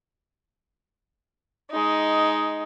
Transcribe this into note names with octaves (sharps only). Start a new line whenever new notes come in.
G#3 D#4